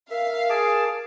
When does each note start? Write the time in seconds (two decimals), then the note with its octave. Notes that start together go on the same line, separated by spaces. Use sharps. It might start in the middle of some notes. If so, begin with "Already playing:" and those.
0.10 A#4 E5 F5
0.50 G#4 A5 D6